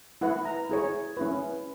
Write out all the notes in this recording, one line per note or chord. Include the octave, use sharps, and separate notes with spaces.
E4 B4 F#5
A#5
E4 G#4 C#5
C#4 E4 B4